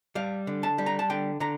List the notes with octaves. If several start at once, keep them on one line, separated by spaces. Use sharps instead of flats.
G3 F5
D3
A5
G3
A#5
A5
D3 G5
D3 A#5